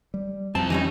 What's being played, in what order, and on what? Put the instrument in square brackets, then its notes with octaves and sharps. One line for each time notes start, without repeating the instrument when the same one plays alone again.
[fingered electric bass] G3
[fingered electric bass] F2 [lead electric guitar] G3 C4 [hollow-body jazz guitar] A5
[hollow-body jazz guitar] E3 G3 C#4 [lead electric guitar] D#4